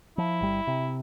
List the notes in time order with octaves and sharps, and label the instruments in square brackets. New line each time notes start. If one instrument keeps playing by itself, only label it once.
[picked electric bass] F3 [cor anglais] E4
[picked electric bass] G1 G3
C3